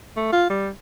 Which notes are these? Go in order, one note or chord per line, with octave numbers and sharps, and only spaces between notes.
A3
F4
G3